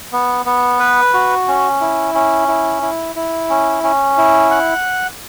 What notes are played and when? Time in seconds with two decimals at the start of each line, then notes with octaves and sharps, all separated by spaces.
0.12 B3
0.46 B3
0.80 B4
1.14 F#4
1.48 C#4
1.81 E4
2.15 C#4
2.48 E4
2.82 E4
3.16 E4
3.50 C#4
3.84 C#4
4.17 E4
4.51 F#5